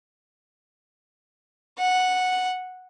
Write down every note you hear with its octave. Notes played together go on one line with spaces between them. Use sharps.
F#5